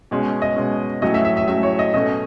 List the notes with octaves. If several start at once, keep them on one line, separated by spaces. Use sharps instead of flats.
B2 G#3 C#4
D#5
B2 G#3 C#4
A2 F#3 C#4 D#5
E5
E5
E5
A2 F#3 C#4 E5
C#5
D#5
B2 A3 C#4 D#5